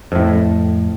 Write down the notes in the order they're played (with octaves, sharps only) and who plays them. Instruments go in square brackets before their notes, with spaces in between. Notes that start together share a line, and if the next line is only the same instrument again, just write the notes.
[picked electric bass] F2 A2